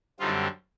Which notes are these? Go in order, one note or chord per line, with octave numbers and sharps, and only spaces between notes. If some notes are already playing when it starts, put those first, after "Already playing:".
F#2 D3 G3 C4 D#4 F4